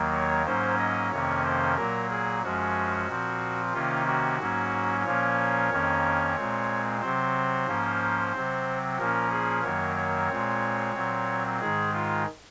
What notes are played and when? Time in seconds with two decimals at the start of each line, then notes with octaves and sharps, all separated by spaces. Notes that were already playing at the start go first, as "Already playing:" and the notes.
Already playing: D#2 D#3 F#3 A#3
0.13 C#5
0.45 G#2 F#3 A#3 C#4 C5
0.78 D#5
1.11 F2 C3 D#3 A#3 C#4 C#5
1.44 C5
1.76 A#2 F#3 A#3 A#4
2.10 G#4
2.42 F#2 F3 G#3 C#4 F#4
3.08 A#2 F3 C4
3.73 C3 D#3 A#3 C#4 F4
4.07 F#4
4.39 G#2 F#3 A#3 C#4
5.04 A#2 F3 A#3 C#4 C#5
5.70 F2 D#3 A#3 C#4
6.35 A#2 G#3 C4
7.01 C3 F#3 C4 C5
7.67 G#2 F3 A#3 C#4
8.32 C3 F#3 C4
8.98 A#2 F3 A#3 C#4 A#4
9.31 G#4
9.63 F#2 D#3 F#3 A#3 C#5
9.96 C#5
10.29 A#2 G#3 C4
10.95 A#2 F#3 C4
11.60 G#2 D#3 G#3 G#4
11.94 F4